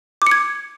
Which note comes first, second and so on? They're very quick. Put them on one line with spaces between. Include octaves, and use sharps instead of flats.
D6 C#7 G#6